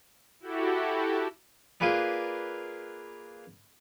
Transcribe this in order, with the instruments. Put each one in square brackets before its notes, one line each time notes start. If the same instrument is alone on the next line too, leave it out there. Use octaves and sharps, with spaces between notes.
[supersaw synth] E4 F#4 G4 A4
[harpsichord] A#3 F4 G#4 B4 D5